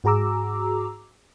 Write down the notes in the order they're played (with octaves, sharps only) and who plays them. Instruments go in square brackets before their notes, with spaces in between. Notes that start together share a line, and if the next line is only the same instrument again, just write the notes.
[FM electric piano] G#2 F#4 G#4 A#5 D6 E6